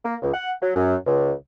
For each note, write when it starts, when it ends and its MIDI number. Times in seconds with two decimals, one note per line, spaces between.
0.05 0.16 58
0.22 0.30 37
0.34 0.53 78
0.62 0.74 54
0.76 0.96 42
1.07 1.32 37